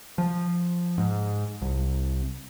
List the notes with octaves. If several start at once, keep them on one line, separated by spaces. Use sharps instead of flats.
F3
G#2
C2